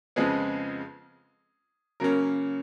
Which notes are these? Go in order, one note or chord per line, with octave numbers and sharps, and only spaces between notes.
F2 C#3 F3 G#3 B3 G#4
C#3 F#3 A#3 C#4 A#4